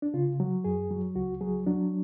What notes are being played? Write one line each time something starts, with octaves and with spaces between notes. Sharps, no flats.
D4
C#3 F4
F#3
F#2 G#4
F#3
C#2 F#4
F#3 G#4
F#3 D4